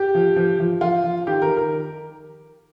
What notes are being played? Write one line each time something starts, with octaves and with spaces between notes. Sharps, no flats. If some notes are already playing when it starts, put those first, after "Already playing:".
Already playing: G4
F3
F3
F3
F3 F4
F3
D#3 G4
A#4
D#3
A#4